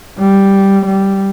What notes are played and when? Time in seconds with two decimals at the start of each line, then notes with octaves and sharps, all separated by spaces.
0.19 G3
0.86 G3